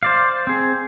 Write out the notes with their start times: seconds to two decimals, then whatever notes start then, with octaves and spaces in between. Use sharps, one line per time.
0.03 C5 D5 F5
0.47 C4 G#4